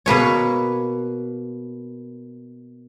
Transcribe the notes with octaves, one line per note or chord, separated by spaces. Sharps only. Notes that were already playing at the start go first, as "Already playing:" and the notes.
B2 A#3 B4 C#5